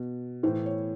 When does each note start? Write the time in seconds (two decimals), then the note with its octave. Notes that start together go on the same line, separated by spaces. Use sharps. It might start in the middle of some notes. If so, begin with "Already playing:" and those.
Already playing: B2
0.43 A2 E3 C5
0.66 C#5